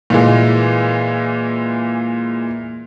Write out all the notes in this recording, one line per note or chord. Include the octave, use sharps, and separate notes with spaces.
A#2 E3 G#3